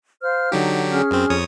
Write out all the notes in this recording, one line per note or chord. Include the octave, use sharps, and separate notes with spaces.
C5 F5 F6
D3 F#3 D#4 G4
C#4 G#4 F6
F#2 C4
F2 C#5 D#6